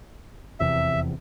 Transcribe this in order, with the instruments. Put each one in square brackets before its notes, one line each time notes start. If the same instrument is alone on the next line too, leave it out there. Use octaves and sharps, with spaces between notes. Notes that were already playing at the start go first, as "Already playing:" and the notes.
[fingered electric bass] F1 E2 C3 [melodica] E5